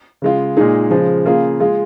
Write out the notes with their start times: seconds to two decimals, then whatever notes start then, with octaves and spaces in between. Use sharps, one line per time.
0.22 C#3 G#3 F4
0.57 A#2 G#3 D#4 G#4
0.91 C#3 F3 G#3
1.25 C#3 A#3 F4 G#4
1.60 G#3 F4 G#4